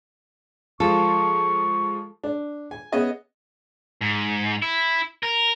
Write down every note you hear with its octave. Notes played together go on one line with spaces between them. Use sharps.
F3 G#3 F4 A4 C#6
D4
G#5
B3 C#4 G#4 D#5 E5
G#2
E4
A#4